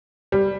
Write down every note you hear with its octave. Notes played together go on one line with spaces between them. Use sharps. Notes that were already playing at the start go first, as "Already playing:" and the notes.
G3